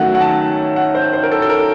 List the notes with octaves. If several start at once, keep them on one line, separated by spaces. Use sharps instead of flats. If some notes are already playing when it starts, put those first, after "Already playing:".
Already playing: D#3 F#3 A3 C#4 F#5
F#5
A5
F#5
C5
C5
A#4
A4
A4
A#4